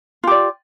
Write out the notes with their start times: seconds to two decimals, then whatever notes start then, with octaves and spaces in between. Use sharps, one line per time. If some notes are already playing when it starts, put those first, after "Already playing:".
0.24 F4
0.27 G4
0.31 D5